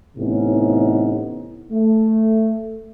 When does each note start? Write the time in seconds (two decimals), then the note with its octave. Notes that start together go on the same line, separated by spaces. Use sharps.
0.17 A1 A2 C3 B3 C#4 D#4
1.72 A3